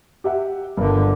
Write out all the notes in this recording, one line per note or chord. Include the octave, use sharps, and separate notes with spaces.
G4 E5 F#5
G1 G2 D3 A#4